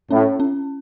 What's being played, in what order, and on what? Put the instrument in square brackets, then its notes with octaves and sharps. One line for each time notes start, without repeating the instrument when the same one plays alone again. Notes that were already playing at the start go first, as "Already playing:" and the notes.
[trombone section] A2 [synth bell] C#4
[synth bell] C#4